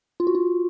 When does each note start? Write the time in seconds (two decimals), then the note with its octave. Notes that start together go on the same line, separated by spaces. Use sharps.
0.20 F4
0.27 F#4
0.35 F4